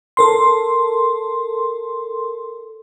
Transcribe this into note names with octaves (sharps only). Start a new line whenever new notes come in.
A4 A#4 C6